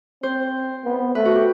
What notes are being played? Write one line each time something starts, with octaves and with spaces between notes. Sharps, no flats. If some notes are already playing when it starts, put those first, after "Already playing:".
C4 C5
B3
A3 B4
F#4
G4